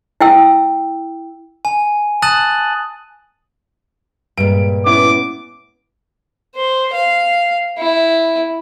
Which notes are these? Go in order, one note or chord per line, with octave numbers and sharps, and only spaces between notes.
E4 G5 E6
G#5
A5 D#6 F#6 A6 D#7 F#7
G2 A#2 G#3 D7
B3 C#4 E4 D6
C5
F5
E4